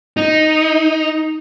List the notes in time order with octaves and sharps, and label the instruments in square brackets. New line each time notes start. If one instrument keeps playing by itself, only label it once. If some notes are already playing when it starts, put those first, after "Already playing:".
[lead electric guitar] D#4